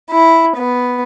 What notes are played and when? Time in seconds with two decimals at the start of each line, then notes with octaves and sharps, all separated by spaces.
0.11 E4
0.57 B3